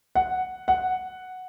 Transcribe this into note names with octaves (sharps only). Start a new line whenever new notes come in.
F#5
F#5